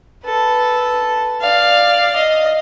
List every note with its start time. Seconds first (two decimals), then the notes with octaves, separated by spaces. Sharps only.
0.24 A4 B4
1.41 D5 F5
2.16 D#5